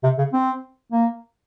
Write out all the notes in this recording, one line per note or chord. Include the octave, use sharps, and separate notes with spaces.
C3
C#3
C4
A#3